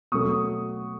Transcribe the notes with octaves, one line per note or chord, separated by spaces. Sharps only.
B2 F#3 A3 C#6 D#6